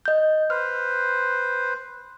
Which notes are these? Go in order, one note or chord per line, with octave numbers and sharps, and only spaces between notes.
D#5 G6
B4 C5 F6